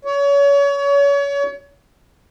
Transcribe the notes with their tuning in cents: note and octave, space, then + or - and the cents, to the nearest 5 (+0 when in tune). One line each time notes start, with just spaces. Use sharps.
C#5 +30